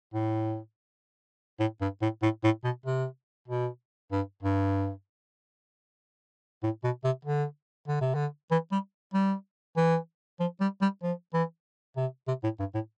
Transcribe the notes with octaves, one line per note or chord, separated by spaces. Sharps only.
A2
A2
G2
A2
A2
A2
B2
C3
B2
G2
G2
A2
B2
C3
D3
D3
C3
D3
E3
G3
G3
E3
F3
G3
G3
F3
E3
C3
C3
A2
G2
A2